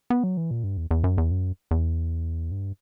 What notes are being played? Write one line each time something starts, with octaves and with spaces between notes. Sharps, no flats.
B3
F#3
E3
A#2
G2
E2
E2
F#2
E2
F#2
E2
G2